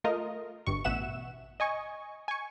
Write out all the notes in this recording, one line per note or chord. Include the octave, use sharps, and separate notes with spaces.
A3 F4 A#4 D#5
G1 G2 C#6
A1 B2 E5 F#5 E7
D#5 G#5 C#6
G#5 C#6